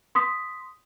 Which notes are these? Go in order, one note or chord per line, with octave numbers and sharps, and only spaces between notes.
C6 D#6 B6